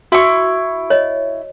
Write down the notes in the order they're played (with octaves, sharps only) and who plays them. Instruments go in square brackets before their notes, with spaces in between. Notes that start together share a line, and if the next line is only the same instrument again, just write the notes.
[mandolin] E4 C#6 [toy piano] F#4
[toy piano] C#5 D#5